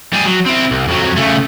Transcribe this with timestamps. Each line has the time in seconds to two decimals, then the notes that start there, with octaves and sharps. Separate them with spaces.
0.14 G3 G#4
0.26 F#3
0.46 C4 E4
0.71 C2
0.88 F2 F#3
1.17 C#3 A3